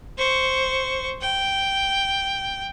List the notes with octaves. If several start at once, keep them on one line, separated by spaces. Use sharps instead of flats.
C5 C#6
G5